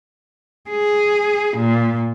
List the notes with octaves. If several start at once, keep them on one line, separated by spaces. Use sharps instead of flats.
G#4
A#2